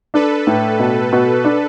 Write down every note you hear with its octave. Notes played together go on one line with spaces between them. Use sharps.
D4 A4 B4
A2
B2
B2
D4